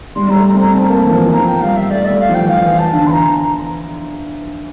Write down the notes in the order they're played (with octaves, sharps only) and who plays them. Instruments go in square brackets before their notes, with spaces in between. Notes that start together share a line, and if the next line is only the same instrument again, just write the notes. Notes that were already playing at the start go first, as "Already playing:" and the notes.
[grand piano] G3 [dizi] C6
[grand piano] G3
[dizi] A#5
[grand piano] A3
[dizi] A#5
[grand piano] C4
[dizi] A#5
[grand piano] C4 [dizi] A5
[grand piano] A#3
E3
F3
E3
[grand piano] F3 [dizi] A#5
[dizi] G5
[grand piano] G3 [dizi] F5
[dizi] E5
[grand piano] A3 [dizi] D5
[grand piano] G3 [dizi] E5
[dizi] F5
[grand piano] F3
[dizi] G5
[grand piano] E3
[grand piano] F3 [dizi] F5
[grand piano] E3
[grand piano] E3 [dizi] A5
[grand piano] D3
[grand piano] E3 [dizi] A#5 C6